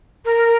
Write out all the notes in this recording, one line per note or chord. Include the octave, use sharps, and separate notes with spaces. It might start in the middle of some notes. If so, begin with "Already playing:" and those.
A#4